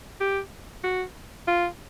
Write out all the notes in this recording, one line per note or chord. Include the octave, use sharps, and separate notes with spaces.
G4
F#4
F4